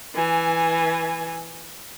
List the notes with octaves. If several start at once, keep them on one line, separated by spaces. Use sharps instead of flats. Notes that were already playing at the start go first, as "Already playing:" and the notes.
E3 G#5